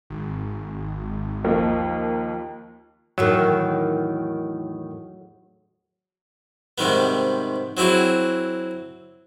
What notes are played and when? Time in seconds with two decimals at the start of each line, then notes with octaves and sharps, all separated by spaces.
0.10 G#1
1.44 D#2 F3 A#3
3.18 E2 A2 D#3 F#3
6.78 G#2 C3 D#3 G3 B3
7.77 F#3 C4 E4 F#4 G#4